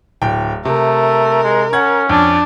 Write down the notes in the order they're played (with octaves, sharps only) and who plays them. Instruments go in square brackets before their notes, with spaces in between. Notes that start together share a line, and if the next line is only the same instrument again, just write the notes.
[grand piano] D1 G5
[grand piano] C3 [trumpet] A3 [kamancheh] A#4
[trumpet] G#3
[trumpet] C#4 [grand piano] F#5 G#6
[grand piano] F2 [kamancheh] D4